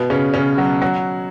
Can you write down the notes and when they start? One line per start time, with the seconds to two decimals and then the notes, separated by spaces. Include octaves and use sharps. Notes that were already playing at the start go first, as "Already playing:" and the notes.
Already playing: B2 B3
0.10 C#3 C#4
0.34 C#3 C#4
0.57 F#3 F#4
0.82 F#3 F#4